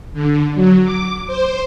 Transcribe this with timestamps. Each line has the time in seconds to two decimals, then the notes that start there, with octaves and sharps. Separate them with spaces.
0.13 D3
0.55 F#3
0.84 D6
1.27 C5